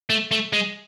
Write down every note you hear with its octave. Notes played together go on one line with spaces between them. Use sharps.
A3
A3
G#3